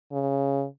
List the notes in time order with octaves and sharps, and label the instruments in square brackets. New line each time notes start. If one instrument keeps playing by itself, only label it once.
[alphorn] C#3